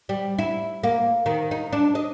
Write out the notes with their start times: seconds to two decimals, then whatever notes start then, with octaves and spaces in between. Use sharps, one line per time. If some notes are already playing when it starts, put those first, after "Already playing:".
0.09 G3
0.39 E4
0.83 A#3
1.26 D#3
1.51 D#4
1.73 D4
1.95 D#5